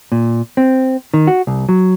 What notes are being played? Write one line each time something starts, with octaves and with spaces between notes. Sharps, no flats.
A#2
C4
D#3
F#4
C2
F#3